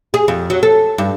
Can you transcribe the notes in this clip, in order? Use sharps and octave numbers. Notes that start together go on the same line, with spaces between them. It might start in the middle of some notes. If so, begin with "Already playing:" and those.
G#4
F2
F#3
A4
G2